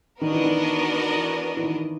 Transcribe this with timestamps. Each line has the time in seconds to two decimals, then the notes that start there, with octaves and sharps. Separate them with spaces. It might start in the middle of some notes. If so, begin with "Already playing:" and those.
0.21 D#3 B3 D4 F#4 A#4 D#5
0.33 E3
0.44 D#3
1.16 E3
1.57 E3
1.63 D#3